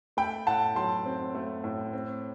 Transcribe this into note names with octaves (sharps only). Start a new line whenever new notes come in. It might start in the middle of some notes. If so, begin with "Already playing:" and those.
A3 G5 B5
A2 F#5 A5
F#3 A5 C6
C4
A3
A2
C4